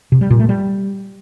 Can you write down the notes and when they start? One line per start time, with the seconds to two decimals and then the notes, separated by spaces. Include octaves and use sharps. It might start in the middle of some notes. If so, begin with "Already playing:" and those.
0.12 C3
0.21 G3
0.30 A#2
0.40 A3
0.49 G3